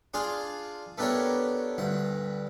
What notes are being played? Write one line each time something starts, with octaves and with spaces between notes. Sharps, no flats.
D4 F4 G#4 F5
A3 B3 D4 G4 A#4 C#5
D2 G2 F#5